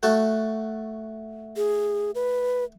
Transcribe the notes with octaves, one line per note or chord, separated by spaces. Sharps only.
A3 F#4 A5
G#4
B4